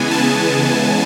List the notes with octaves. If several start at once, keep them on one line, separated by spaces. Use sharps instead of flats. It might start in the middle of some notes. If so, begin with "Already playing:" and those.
Already playing: C#3 E3 G#3 B3 G#5
A5